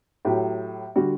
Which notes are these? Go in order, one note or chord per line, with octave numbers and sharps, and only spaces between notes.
A2 F#3 G4
D3 G3 F#4